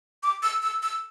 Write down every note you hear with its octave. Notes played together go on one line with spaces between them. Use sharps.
D6
E6
E6
E6